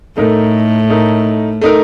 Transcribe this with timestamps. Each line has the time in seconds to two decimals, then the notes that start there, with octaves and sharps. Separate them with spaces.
0.17 A2 A3 D#4 A#4
0.90 A3 D#4 A#4
1.61 A3 D#4 A#4